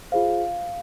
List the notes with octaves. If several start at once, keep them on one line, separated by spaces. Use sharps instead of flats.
F4 G#4 C5 F5